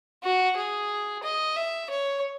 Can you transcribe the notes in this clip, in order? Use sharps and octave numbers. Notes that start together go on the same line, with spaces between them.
F#4
G#4
D#5
E5
C#5